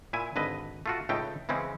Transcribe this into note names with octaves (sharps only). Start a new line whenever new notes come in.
A#2 E4 G#5
G#1 D3 B4 D#5
A3 F4 F#4
C#2 A2 A3 D#4 G5
C#3 E3 G#3 C4 C#4